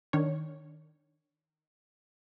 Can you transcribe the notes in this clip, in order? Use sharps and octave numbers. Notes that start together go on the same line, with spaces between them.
D#3 D4 C#5